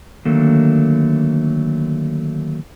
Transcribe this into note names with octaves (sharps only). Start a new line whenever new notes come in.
D3 D#3 F#3 A3 A#3